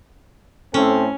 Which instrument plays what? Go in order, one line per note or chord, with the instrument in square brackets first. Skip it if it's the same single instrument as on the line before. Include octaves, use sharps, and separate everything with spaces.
[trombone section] A2 C4 A4 [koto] C#4